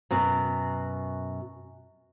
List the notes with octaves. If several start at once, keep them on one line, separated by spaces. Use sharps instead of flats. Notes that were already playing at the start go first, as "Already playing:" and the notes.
F#2 B2